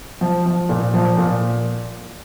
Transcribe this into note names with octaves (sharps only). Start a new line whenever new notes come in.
F3
F3
A#2
F3
A#2